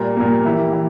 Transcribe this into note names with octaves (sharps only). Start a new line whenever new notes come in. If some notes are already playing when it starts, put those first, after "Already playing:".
Already playing: A#2 G3 A#3
A#2 G3 A#3
E3 A#3 E4 G4
E3